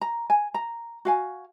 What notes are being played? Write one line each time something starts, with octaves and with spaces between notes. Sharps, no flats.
A#5
G#5
A#5
F#4 F5 G#5